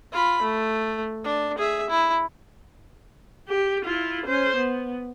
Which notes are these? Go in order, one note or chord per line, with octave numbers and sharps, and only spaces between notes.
F4 B5
A3
D4
G#4 E5
E4
G4
E4 F4
C#4 C5
B3